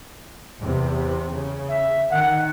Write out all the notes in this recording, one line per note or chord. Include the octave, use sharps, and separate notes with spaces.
E2 C3
C#3
E5
D#3 F#5